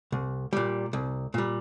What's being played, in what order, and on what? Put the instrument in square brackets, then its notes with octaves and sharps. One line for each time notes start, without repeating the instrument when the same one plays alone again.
[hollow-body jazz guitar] C2
A#2 G3
C2
A#2 G3